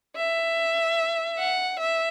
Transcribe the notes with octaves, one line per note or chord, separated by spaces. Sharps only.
E5
F#5
E5